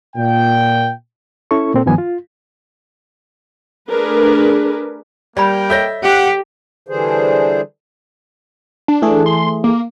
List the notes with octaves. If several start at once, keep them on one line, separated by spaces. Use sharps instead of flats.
A#2 G5
C#4 E4 A4 C#6
A#2 C4 A4
G2 D#3 F3 B3 G#5
F4
A3 D4 G#4 A#4 B4
G3 A#3 A#4 D5 G5 B5
A4 C#5 D#5 E5 G6 A#6
G4 F#5
D3 E3 G3 D4 G#4 C5
D4
E3 A3 G#4
C6
A#3